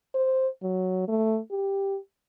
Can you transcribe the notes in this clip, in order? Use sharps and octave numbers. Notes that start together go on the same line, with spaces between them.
C5
F#3
A3
G4